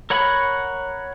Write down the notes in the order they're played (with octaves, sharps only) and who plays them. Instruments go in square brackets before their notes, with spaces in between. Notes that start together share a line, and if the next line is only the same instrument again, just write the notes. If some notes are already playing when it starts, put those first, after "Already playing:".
[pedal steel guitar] A#4 C#5 F#5 B5